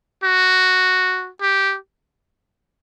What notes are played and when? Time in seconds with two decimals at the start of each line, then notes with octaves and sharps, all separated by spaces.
0.24 F#4
1.41 G4